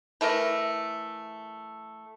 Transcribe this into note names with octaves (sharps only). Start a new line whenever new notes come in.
E3 A3 A#4 D#5